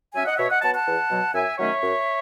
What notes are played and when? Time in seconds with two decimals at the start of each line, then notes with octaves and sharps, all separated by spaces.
0.13 F#3 C#4 E5 G#5
0.26 D#5 F#5
0.37 B2 C#5 E5
0.49 D#5 F#5
0.62 F#3 B3 F#5 A5
0.73 F#5 A5
0.86 E2
1.10 B2 F#3
1.34 F#2 E5 G#5
1.58 D#3 F#3 A3 C#4 C#5 E5
1.82 F#2